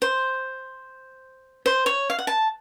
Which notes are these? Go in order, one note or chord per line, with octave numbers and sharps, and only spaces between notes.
C5
C5
C#5
F5
F#5
A5